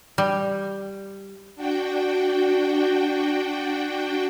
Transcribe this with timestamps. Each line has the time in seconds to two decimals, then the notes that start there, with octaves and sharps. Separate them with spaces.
0.18 G3
1.56 D4 F#4 G5